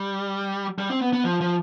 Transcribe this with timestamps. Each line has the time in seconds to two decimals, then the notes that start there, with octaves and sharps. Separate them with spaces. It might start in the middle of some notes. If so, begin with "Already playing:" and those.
Already playing: G3
0.78 G3
0.90 C4
1.01 B3
1.13 B3
1.24 F3
1.41 F3